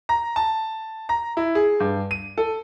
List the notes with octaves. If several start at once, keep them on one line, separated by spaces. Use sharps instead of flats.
A#5
A5
A#5
E4
G#4
G2
D#7
A4